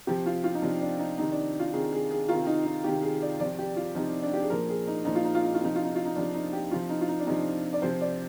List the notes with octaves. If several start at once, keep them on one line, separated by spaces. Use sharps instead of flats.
C3 F3 G4
F4
F4
D#4
C3 F3 D4
D4
D#4
C3 D#3 D#4
D4
F4
C3 D#3 G#4
G#4
G#4
C3 D#3 F4
D#4
D#4
C3 D#3 G4
G#4
D5
C3 F3 D5
G4
F4
C3 F3 D#4
D4
G4
G#4
A#2 F3 A#4
G#4
D#4
A#2 F3 D#4
F4
D#4
F4
D#4
F4
C3 F3 D#4
F4
D#4
F4
D#4
C3 F3 D4
D#4
G4
C3 F3 F4
D#4
F4
D#4
D4
C3 F3 D#4
D5
C3 F3 C5
D5